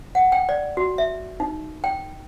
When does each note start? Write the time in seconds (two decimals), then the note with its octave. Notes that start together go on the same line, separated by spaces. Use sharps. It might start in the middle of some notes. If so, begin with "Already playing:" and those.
0.15 F#5
0.32 G5
0.49 D5
0.77 F#4
0.98 E5
1.40 D#4
1.84 G5